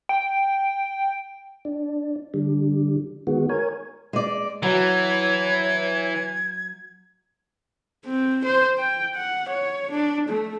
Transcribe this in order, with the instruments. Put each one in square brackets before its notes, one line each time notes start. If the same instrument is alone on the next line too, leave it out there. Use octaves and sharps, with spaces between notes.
[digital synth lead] G5
[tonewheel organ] D4
D3 G3
D#3 G#3 B3 F#4
A#4 C#5 G#5
[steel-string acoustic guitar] G#3 D5
[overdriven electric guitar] E3 [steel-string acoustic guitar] F#3 [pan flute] C#5 [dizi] G#6
[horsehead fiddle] C4
C5
G5
F#5
C#5
D4
A3